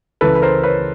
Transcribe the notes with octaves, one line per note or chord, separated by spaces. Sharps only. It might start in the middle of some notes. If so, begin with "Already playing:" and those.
C#2 C#3 E3 A4 B4
B4
A#4 C5
B4 C#5